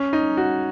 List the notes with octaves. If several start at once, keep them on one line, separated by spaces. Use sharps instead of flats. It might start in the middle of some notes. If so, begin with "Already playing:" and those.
Already playing: C#4
D#4
F#4